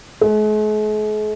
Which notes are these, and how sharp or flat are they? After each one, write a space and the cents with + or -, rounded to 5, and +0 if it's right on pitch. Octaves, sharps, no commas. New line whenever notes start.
G#3 +45